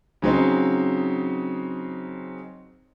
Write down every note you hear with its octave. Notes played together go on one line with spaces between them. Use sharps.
C#3 F#3 C4 D#4